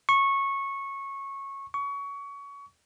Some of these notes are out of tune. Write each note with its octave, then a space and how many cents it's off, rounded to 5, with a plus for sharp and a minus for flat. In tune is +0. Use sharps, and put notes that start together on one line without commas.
C#6 -15
C#6 +25